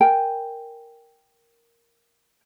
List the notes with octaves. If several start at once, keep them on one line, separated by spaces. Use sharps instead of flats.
A#4 G5 G#5